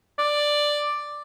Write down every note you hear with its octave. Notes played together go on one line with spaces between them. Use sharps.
D5